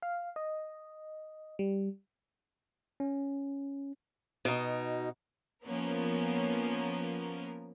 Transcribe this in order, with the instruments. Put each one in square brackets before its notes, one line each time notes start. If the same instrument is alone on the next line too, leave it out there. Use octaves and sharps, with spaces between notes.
[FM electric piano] F5
D#5
G3
[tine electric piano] C#4
[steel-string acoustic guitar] B2 D#4
[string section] F3 A#3 B3 C#4 A#4